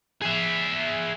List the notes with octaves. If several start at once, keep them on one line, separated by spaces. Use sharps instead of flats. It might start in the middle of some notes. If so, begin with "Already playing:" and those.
G#4 E5